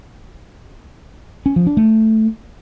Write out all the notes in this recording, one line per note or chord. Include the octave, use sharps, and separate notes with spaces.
C#4
F3
D4
A3